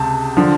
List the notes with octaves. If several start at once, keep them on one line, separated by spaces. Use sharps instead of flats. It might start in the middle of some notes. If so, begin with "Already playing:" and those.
Already playing: C#2 C3 A5
D3 F3